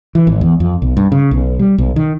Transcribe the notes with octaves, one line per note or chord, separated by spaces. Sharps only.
E3
G#1
E2
F2
B1
G2
C#3
B1
G3
B1
D#3